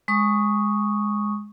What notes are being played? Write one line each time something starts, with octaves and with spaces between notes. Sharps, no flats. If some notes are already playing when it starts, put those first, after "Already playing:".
G#3 C#6 D#6